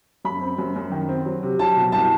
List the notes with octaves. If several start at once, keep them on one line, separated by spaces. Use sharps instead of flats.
F#2 B5
C4
F#2
F#2
D#3
C4
F#3
C3
F#3 A5
B2
C2 A5